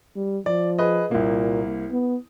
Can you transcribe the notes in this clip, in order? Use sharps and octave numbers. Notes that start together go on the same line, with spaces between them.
G3
F3 D5
G#4 B4 D#5
C2 A#2 A#3
B3